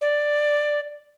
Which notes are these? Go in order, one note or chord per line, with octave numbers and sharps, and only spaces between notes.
D5